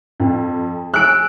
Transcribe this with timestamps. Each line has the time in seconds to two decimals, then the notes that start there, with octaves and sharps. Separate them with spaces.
0.20 F2
0.94 G#5 E6 F#6 D7